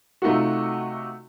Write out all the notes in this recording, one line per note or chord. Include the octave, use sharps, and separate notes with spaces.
C3 A3 D#4 F4 F#4